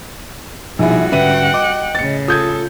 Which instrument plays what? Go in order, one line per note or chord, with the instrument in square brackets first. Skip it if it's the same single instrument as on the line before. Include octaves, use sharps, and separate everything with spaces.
[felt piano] A#1 E4 [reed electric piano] B2 F3 D#4 [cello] G3 F#4 [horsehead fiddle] G#4
[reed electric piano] G#2 D3 C#4 [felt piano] B4 E5 D#7 [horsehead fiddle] F#5 G5
[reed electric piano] D#5 [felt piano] D6
[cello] A2 C#3 [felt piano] A6 C#7
[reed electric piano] F4 [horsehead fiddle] A4 [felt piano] D#6 G6 G#6